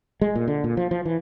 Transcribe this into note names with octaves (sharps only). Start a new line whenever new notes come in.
G#3
A#2
D3
A#2
F3
F3
E3